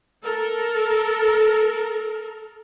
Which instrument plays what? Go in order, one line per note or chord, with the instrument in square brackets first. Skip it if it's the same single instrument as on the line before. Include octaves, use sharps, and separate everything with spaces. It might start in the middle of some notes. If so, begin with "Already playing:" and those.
[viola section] A4 A#4